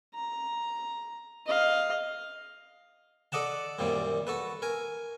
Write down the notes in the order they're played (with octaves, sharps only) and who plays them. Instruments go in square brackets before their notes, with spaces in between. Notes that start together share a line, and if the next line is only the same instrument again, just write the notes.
[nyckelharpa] A#5
D#5 F5
[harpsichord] A4 D5 D#5 F#5 A5
F#2 A#2 D#3 G3 C4
F#4 A4 B4
A#4 G#5